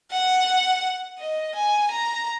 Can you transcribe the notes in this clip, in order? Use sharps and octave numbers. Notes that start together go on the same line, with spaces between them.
F#5
D#5
G#5
A#5